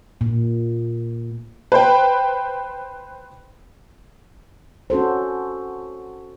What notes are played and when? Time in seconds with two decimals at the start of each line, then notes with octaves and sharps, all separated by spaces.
0.21 A#2
1.72 B4 C5 G5
4.90 C#4 F#4 A4 C5